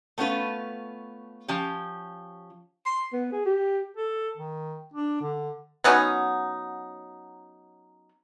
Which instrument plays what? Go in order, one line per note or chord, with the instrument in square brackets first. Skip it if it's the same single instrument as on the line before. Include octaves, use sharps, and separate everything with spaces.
[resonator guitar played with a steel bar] A3 B3 C#4 F4 B4
F3 C#4 G4
[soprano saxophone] C6
B3
G#4
G4
[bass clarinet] A4
D#3
D4
D3
[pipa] F#3 B3 C#4 D#4